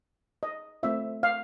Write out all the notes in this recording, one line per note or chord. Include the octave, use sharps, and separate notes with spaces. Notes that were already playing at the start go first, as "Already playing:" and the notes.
D#5
A3 C4 F4 E5
F5